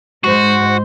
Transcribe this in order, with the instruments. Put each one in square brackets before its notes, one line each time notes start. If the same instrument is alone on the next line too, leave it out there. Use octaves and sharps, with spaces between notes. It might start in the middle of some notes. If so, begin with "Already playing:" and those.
[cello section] G#2 G#3 C5 [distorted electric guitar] F#4